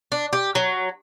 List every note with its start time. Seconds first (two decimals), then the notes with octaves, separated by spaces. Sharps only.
0.12 D4
0.33 G4
0.55 F#3